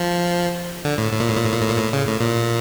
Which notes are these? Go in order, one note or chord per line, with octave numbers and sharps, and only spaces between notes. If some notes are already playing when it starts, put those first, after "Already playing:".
Already playing: F3
D3
A2
A2
A#2
A2
A#2
A2
A#2
A2
A#2
A2
C#3
A2
A#2